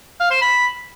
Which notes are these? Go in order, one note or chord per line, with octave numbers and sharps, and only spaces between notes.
F5
C5
B5